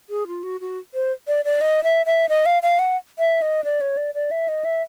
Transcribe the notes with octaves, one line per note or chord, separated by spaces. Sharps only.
G#4
F4
F#4
F#4
C5
D5
D5
D#5
E5
E5
D#5
F5
F5
F#5
E5
D#5
D5
C#5
D5
D5
E5
D#5
E5